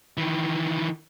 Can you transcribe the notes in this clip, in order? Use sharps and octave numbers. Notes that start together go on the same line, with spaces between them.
D#3 E3